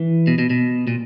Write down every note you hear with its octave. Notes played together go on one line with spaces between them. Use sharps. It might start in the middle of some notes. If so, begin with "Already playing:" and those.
Already playing: E3
B2
B2
B2
A#2